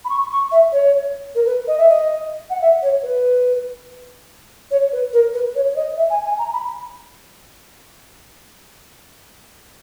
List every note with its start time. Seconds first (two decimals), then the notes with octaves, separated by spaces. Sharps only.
0.05 B5
0.10 C#6
0.31 C#6
0.52 E5
0.72 C#5
1.35 A#4
1.46 B4
1.68 D#5
1.78 E5
1.89 D#5
2.50 F#5
2.61 E5
2.82 C#5
3.03 B4
4.71 C#5
4.92 B4
5.13 A#4
5.34 B4
5.55 C#5
5.71 C#5
5.76 D#5
5.97 E5
6.10 G#5
6.25 G#5
6.39 A#5
6.53 B5